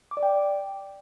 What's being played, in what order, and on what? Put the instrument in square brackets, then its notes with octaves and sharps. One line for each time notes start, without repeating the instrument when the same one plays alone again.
[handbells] D6
D5
G5